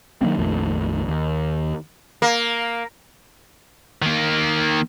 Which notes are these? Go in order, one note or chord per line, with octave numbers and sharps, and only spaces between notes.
D#3 F#3 A#3 C4
A#1 F2 D#3 A3
D#2
A#3
D#3 A#3